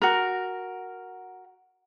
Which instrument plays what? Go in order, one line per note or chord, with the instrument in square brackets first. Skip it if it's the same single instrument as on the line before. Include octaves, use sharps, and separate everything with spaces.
[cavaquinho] F#4 A#4